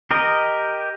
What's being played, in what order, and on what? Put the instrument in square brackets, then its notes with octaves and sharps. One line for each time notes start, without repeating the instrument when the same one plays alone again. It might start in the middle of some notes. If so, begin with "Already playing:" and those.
[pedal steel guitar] G4 A#4 D#5